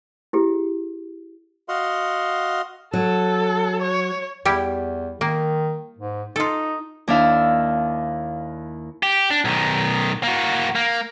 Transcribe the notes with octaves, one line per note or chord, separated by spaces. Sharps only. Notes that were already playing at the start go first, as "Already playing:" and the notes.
E4 G4 G#4
F#4 D#5 F5 F#5 C6
F#3 A4
C#5
E2 G3 E4 G4
D#3 A#3
G#2
D#4 F4 A4
D#2 D4 E4 F5 E6
G4
D4
B1 D#3
A#3 F#4
A#3